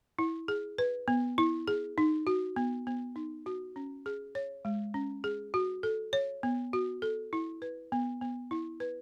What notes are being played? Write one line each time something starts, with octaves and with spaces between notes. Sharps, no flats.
E4
G#4
B4
B3
E4
G#4
D#4
F#4
B3
B3
D#4
F#4
C#4
G#4
C#5
G#3
C#4
G#4
F#4
A4
C#5
B3
F#4
A4
E4
B4
B3
B3
E4
B4